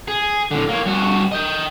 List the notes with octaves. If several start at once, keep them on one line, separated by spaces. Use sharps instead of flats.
G#4
A2 D3
A#3 C#5
G2 F#4
D#5 G5